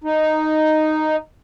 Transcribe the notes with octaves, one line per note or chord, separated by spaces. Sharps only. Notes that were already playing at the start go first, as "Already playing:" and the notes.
D#4